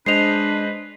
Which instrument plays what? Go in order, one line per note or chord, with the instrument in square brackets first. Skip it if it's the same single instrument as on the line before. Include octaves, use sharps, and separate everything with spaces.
[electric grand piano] G#3 C5 D#5 [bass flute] D4 [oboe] B4 [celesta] C7 F7